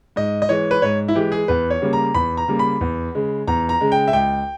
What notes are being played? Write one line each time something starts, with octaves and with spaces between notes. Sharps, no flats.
G#2 D#5
D#5
E3 G#3 C#5
B4
G#2 C#5
E4
E3 G#3 G4
G#4
E2 B4
C#5
C#3 G3 A#3
A#5
E2 B5
A#5
C#3 G3 A#3
B5
E2
C#3 G#3
E2 A#5
A#5
C#3 G#3
G5
E5
C#2 G5